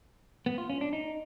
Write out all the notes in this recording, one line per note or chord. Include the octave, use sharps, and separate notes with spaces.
B3
F4
C#4
D4
D#4